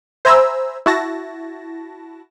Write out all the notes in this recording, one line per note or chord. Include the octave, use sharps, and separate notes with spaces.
C5 E5 G#5 A#5 B5 E6
E4 F#4 A5 A#6